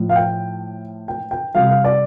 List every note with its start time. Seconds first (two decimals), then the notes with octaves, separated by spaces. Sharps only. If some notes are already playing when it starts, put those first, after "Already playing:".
Already playing: A2 F3
0.09 F5
0.16 G5
1.08 G5
1.31 G5
1.55 C3 G3 F5
1.69 F5
1.84 D5